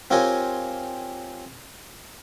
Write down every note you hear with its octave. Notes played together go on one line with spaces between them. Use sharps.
C4 F4 G4 A#4 C#5 G#5